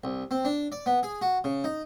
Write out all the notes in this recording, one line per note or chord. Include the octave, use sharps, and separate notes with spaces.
C2
C4
D4
D5
B3
G#4
F#4
C#3
D#4